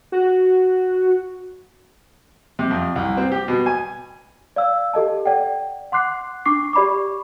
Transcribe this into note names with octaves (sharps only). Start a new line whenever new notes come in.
F#4
C3
F2
C2
C4
G4
B2
G#5
D5 F5 E6
G4 A4 D#5 A5
D5 F#5 G5
F#5 C6 D6 F#6 C7
D4 C#6 D6 C7
G4 D5 B5 C#6 D6